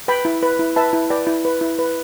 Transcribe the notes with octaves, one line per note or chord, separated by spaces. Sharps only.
B4 G5 B5
E4
B4
E4
B4 E5 A5
E4
B4 D5 G5
E4
B4
E4
B4